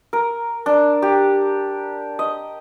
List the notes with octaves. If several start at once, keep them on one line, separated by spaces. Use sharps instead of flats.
A#4
D4
G4
D#5